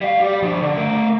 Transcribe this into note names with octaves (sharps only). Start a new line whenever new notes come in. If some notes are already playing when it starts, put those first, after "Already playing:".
G3 F5
G4 D5
F3 D4
D3
A3 A#4